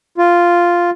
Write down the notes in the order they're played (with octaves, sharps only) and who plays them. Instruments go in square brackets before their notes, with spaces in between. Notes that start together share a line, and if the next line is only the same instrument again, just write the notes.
[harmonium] F4